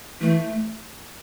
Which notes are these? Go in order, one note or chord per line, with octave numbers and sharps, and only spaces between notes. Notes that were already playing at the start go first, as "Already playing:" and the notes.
E3 A3